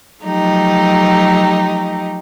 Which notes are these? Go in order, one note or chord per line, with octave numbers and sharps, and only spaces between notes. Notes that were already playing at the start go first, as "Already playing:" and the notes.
F3 F#3 A3 D#4 G4